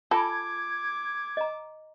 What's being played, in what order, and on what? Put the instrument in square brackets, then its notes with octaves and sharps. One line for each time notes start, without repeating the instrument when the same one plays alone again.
[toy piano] F4 G#5 B5 [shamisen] A4 [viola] D6 [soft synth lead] G#6
[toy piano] D#5 A#5